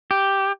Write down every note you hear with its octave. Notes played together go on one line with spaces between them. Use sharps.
G4